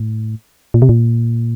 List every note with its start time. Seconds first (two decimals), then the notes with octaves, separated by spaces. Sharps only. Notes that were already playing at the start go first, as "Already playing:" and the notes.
Already playing: A2
0.74 A#2
0.82 C3
0.89 A#2